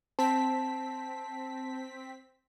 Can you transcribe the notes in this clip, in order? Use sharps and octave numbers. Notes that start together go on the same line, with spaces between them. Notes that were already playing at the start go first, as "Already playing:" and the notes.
C4 A5 B6